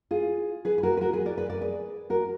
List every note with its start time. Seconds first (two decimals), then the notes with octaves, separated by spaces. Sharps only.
0.11 F4 G#4
0.65 G#4 B4
0.78 B4
0.83 F#4 A#4
0.97 B4
1.01 F#4 A#4
1.13 G#4 B4
1.25 A#4 D5
1.37 G#4 B4
1.50 A#4 D5
1.61 G#4 B4
2.10 F#4 A#4